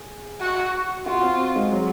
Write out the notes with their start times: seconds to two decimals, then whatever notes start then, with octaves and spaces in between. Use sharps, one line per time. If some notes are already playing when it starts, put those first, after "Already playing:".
Already playing: G#4
0.41 F#4
1.06 F4 F#4
1.23 C4
1.39 C4
1.56 G#3
1.71 F#3